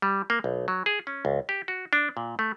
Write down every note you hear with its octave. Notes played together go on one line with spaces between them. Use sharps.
G3
A#3
B1
F#3
G#4
C#4
C#2
G4
F#4
D4
A#2
A3